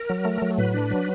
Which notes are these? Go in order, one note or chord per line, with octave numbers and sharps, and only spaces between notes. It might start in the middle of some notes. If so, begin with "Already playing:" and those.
Already playing: A#4
F#3
A3
F#3
A2 B4
D4
F#3